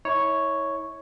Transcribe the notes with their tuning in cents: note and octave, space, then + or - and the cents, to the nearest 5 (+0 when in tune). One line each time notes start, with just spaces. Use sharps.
E4 -35 C#5 +0